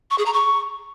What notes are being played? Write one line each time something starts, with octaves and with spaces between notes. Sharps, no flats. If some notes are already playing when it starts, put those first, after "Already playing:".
C#6
G#4
A#5
C#6